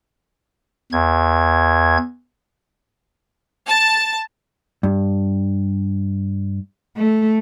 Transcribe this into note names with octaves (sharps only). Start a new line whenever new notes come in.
E2 G#6
A5
G2
A3